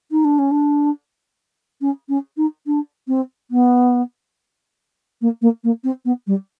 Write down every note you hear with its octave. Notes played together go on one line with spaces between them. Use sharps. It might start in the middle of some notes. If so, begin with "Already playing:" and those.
D#4
D4
C#4
D4
C#4
C#4
D#4
D4
C4
B3
A#3
A#3
A#3
C4
B3
G3